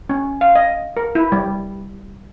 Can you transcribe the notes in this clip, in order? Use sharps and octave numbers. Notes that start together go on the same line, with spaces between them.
C#4
F5
D#5
A#4
E4
G3